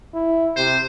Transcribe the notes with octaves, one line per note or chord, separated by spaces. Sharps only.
E4
C3 C5